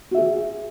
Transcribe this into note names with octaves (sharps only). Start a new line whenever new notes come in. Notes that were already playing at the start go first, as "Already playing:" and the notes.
F#4 G#4 E5